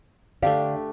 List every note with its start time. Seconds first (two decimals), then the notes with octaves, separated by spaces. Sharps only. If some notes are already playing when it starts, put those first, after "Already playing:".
0.42 D3 A3 D4 G4 D5 F5